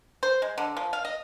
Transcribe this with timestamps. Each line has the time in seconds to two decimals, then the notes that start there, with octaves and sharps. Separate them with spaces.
0.23 C5
0.42 G#3
0.58 D3
0.77 F3
0.93 F5
1.05 D#5